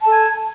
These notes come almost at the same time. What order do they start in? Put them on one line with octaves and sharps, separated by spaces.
A5 A4 G#5